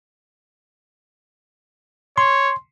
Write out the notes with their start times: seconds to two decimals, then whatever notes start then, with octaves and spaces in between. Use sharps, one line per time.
2.18 C#5 C6